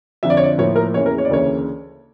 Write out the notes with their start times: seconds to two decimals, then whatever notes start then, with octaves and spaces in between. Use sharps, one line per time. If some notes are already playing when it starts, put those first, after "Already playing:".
0.23 F2 D3 F3 E5
0.30 D5
0.37 C#5
0.44 D5
0.58 A2 F3 A#3 C#5
0.76 A#4
0.94 E2 C#3 E3 A#3 C#5
1.06 A#4
1.18 C#5
1.25 D5
1.29 D2 C#3 E3 A#3 C#5